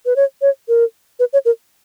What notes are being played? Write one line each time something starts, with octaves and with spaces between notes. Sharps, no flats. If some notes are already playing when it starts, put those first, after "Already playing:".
B4
C#5
C#5
A#4
B4
C#5
A#4